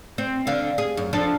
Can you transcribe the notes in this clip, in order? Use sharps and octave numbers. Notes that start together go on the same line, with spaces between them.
C4
D3 F5
G#4
F#2
F3 D4 A4